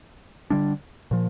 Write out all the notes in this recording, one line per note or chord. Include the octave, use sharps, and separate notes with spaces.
D3 G3 D4
A#2 F3